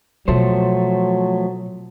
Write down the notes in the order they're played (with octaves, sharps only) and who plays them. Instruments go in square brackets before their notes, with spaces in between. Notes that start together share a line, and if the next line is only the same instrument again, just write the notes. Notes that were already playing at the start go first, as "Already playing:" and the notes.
[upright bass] B2 [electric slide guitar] F3 A3 C5 [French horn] F#3